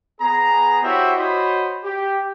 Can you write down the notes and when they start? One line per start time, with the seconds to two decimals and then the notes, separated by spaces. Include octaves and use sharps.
0.20 B3 G#4 A#5
0.83 E4 F#4 G4 C5 C#5 E5
1.16 F#4 C5 C#5 D#5 B5
1.84 G4